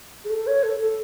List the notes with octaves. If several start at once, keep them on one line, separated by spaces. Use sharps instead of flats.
G#4
A4
C#5
A4
A4